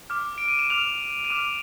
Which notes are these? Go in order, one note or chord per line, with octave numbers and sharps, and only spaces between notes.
D6 F6
D7
D#7
E7
D6 F6 F7
D#7
D6 F6 E7